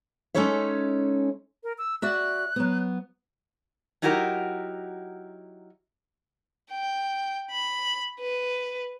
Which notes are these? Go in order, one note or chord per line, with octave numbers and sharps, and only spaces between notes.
G#3 C#4 D#4 A4 C#5 E5
A#4
E6
F#4 D5 E5 F#6
F#3 B3
F#3 D#4 E4 F#4 G4 A#4
G5
B5
B4